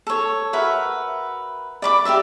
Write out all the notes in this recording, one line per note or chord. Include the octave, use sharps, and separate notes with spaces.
A4 C#5
F#4 A#4 B4 E5
D5 B5 D6
G4 A#4 D5 E5